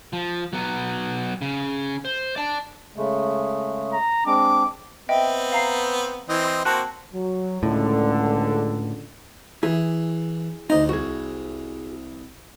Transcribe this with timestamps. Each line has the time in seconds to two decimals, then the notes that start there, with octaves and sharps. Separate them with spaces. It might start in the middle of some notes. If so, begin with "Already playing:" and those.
0.13 F3
0.53 F#3 B3
1.42 C#3
2.05 C5
2.36 D5 A5
2.96 C#3 G#3 A3
3.92 A#5
4.26 G#3 C4 D4 D6
5.09 B3 C4 D#5 E5 G5
5.52 F5 A#5 C7
6.29 E3 C4 D#5
6.65 A#3 C4 F#4 A5 F#6
7.13 F#3
7.63 C#2 A2 D3
9.63 E3 E4 G#4
10.70 D2 D#4 C5 D#5
10.89 C2 F#4 G#4